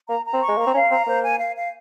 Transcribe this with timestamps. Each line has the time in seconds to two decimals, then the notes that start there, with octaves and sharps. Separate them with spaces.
0.09 A#3 A#5
0.26 A#5
0.33 C4
0.41 C#6
0.49 G#3
0.57 A#3 A#5
0.67 C4
0.74 C#4 F5
0.90 C4 A#5
1.06 A#3 C5
1.23 G#5
1.39 F5
1.56 F5